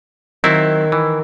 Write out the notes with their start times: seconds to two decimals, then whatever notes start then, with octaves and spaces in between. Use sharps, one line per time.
0.44 D#3 F#3 C4 E4
0.92 E3